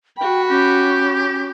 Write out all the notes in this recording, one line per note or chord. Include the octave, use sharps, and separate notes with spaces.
F#4 G5 B5
C#4 G4